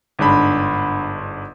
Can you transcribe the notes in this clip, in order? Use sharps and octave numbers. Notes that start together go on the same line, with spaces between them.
G1 G#2 D4 B5